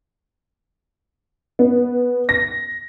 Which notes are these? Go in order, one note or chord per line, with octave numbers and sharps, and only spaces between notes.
B3
A#6